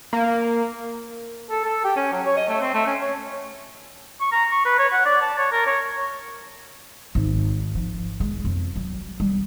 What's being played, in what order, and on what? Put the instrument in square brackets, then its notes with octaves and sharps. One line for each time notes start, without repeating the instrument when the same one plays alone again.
[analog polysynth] A#3
[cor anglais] A4
A4
G4
C#4
F#3
C#5
D#5
A3
C4
A3
C#4
C#5
[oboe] C#6
A#5
C#6
B4
C#5
F#5
D5
A5
C#5
A#4
C#5
[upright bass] G#1
F3
G#3
F2
F#3
G3